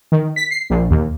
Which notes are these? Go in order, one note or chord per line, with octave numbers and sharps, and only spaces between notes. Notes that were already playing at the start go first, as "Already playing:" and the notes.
D#3
B6
C7
A#1
D#2